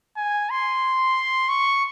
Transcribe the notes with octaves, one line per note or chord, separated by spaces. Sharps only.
G#5
C6
C#6